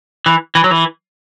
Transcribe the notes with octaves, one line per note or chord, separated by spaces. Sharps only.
E3
E3
F#3
E3